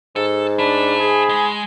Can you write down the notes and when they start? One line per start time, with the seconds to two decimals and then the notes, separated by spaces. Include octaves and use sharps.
0.16 G#2 A4
0.59 D4 E5 A5 B5
1.00 G#4
1.29 G#3